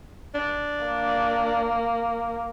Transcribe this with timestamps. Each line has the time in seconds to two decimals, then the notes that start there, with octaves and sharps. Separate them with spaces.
0.35 D4
0.85 A#3